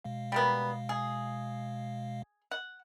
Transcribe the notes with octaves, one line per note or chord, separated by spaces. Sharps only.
B2 G#3 F5
G3 A#3 B3
G#4
F#5